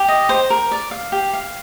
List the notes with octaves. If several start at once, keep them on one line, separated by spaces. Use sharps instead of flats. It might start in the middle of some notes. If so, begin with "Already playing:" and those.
Already playing: G4
D#5
C5
A#4
D5
F5
G4
F5